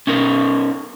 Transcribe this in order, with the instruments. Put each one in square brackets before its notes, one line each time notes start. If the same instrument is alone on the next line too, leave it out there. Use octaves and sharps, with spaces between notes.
[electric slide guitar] C#4 D#4 A#4